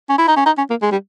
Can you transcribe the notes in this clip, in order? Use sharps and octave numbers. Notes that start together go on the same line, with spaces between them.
C#4
E4
D#4
C#4
D#4
C#4
A#3
G#3
G3